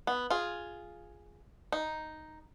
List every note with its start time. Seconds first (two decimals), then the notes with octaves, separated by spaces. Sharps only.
0.07 B3
0.30 F4 G#4
1.72 D#4